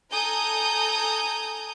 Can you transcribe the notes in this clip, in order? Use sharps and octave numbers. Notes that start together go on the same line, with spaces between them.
A4 G#5 A#5 D#6 G6